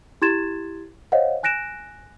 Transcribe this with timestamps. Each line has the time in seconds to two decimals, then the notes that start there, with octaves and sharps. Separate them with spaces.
0.22 E4 G4 C6 G#6 A6 E7
1.12 C5 C#5 D#5 F5 F#5
1.43 G#5 F#6 A#6 D7 E7